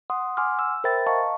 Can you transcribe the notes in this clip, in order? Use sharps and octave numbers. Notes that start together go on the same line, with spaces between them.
F#5 C6 D#6
F#5 G#5 C6 D6 F6
E6
A#4 C5 E5 G5 B5 A6
D#5 F5 A5 A#5 C#6